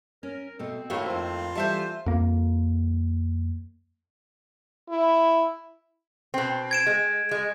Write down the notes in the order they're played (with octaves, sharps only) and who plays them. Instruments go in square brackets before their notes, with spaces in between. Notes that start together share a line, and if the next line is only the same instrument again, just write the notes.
[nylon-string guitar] C#4 [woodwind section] A#4
[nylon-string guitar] B2 A3 [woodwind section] C4
[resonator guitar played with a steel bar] A2 D#3 A#3 [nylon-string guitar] F#4 C#5
[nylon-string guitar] F2 C5 [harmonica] F4
[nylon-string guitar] E3 G3 A3 [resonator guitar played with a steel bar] C5 E5 A5
[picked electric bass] F2 A#3
[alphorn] E4
[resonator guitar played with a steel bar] B2 C4
[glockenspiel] G#6 D7 E7
[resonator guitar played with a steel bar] G#3
G#3